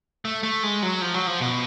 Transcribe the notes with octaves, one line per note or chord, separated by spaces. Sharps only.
A3
A3
G#3
F#3
F3
F#3
F3
B2